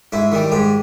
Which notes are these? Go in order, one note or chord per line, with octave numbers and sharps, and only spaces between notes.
G#2 E4
D#3 G3
G#2 G4